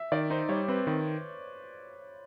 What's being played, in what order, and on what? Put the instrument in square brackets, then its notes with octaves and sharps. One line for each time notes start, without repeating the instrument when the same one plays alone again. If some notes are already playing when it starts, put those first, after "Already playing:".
Already playing: [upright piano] E5
[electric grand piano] D#3 [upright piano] D5
[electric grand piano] D#4 [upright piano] C5
[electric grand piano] G3 [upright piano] C#5
[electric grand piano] C4 [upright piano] B4
[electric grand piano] D#3 [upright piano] B4